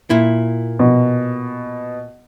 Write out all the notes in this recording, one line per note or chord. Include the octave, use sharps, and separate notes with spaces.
A#2 E4
B2